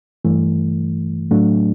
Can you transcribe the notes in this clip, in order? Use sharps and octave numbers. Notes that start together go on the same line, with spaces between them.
G2 E3 A3
A2 F#3 A3 D4